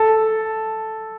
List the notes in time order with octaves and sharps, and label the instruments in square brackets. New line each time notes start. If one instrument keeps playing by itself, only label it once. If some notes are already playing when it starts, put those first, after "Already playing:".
Already playing: [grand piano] A4